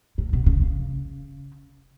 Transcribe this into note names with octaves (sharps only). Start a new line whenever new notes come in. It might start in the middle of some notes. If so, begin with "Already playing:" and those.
A2
B2
C#3
C#3